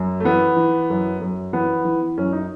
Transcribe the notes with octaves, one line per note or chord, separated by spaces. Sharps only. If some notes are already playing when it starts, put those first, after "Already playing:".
Already playing: F#2
A3
E3 B3
E3
F#2
F#2
E3 B3
E3
F#2 C#4
D#4